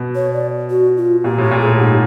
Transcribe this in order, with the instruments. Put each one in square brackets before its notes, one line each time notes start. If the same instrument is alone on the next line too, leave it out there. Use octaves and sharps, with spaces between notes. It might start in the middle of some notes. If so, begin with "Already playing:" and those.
Already playing: [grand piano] B2
[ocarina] C#5
D5
F#4
F4
[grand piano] A#2 [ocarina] G4
[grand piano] A2 [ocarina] G4
[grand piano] A#2
[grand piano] A2 [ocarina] G#4
[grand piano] G#2 [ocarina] G4